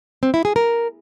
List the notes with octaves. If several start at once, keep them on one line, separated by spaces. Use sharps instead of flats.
C4
E4
G#4
A#4